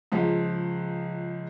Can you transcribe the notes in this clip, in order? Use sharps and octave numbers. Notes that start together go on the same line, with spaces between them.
C#2 F3